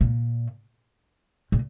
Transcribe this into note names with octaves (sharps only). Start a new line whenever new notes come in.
A#2
A#2